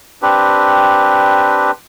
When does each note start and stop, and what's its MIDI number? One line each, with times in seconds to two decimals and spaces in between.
0.22 1.71 60
0.22 1.71 62
0.22 1.71 67
0.22 1.71 71